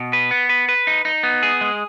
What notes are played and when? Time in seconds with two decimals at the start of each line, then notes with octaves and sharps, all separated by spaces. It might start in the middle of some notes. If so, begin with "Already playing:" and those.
Already playing: B2
0.13 B4
0.31 B3
0.49 B4
0.69 B4
0.87 D#4
1.05 D#4
1.23 B3
1.43 G#4
1.61 G#3